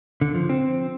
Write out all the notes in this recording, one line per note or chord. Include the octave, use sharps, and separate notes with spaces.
D3
F3
C4